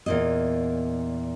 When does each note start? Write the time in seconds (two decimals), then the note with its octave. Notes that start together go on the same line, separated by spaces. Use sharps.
0.06 E2 A#2 D#5